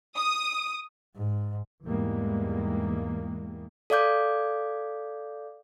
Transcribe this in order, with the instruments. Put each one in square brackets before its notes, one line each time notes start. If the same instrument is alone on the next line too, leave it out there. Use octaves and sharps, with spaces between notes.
[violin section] D#6
[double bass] G#2
[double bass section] E2 G#2 E3 G3 G#3 A#3
[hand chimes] A4 D5 F5 D6 G6